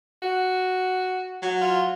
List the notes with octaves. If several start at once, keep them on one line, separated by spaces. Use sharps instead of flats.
F#4
F#3
F4